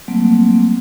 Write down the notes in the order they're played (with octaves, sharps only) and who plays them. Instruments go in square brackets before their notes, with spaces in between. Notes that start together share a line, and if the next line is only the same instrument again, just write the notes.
[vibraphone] F#3 G3 A3 A#3 C4